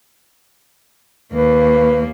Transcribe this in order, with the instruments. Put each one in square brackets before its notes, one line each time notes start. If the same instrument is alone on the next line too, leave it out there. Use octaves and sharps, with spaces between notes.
[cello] D#2 A#3 [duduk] B4